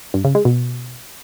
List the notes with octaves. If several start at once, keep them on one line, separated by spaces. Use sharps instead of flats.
G2
C#3
G#3
B2